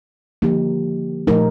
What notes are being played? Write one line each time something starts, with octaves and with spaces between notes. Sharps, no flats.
D3 F3 A#3 D#4 G4
A#2 F3 A3 D#4 A#4